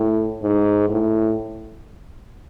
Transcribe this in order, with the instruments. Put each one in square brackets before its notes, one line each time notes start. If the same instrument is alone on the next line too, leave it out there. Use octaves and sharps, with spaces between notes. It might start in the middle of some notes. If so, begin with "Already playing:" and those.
Already playing: [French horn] A2
G#2
A2